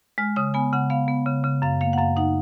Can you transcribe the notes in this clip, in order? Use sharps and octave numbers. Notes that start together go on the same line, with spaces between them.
G#3 F6
C#3 D#6
B3 G#5
C#3 F#5
B3 F5
B3
C#3
C#3
F#2 F5
A#3 F5
F#5
F#2 F5
D#4 F#5